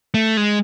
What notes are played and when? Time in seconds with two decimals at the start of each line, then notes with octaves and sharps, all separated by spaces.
0.14 A3
0.37 G#3